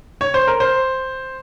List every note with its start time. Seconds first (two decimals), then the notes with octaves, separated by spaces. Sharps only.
0.21 C#5
0.34 C5
0.47 A#4
0.60 C5